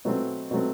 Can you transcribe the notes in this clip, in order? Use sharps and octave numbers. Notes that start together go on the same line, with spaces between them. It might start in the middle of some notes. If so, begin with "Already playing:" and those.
B2 F#3 A3 C4
B2 F#3 A3 C4